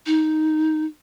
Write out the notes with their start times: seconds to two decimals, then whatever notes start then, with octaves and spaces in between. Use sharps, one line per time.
0.06 D#4